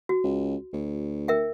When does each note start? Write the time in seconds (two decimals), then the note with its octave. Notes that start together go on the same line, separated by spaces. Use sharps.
0.09 F#4
0.24 C#2
0.73 D2
1.28 A#4 E5 G5